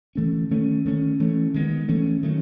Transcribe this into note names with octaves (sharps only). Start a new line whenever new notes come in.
E3 A3 C#4
D#3 A3 C#4
D#3 A3 C#4
E3 A3 C#4
D#3 G#3 B3
E3 A3 C#4
D#3 F#3 A3 C#4